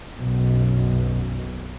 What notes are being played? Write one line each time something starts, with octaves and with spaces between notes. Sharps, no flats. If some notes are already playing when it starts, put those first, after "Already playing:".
B1 F#2 B2